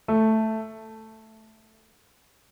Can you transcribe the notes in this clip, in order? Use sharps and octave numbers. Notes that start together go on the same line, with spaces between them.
A3